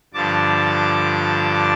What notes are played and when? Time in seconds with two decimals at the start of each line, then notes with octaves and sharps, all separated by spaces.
0.14 G2 D3 F3 A5 D6